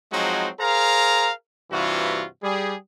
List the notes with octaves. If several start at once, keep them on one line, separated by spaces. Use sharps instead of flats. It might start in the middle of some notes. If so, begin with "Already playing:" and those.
F3 F#3 G#3 C4 D#4 F#4
G#4 A#4 C5 F5 A#5
G2 C3 E3 F4 F#4
G3 G#4